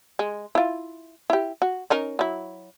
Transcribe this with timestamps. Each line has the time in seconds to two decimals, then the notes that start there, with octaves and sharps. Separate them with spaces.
0.19 G#3
0.55 E4 F4
1.30 E4 G4
1.62 F#4
1.90 C#4 D#4 A#4
2.19 F#3 E4